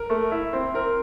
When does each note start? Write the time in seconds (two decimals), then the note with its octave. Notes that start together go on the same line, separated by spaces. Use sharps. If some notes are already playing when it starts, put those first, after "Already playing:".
Already playing: A#4
0.10 A3
0.32 E4
0.53 C4
0.74 C4 A#4